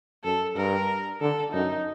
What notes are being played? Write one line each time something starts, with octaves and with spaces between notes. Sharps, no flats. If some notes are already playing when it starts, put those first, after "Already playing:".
F#2 A4
G2 A#4
D3 A4
F#2 D#4